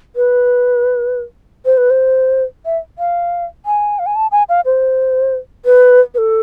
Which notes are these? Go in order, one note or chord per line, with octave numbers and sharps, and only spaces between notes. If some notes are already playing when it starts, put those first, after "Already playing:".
B4
C5
B4
C5
E5
F5
G#5
F5
G#5
A5
G#5
F5
C5
B4
B4
A4